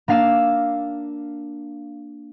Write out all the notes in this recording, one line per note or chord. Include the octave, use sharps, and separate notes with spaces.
A#3 D4 F5 E6 E7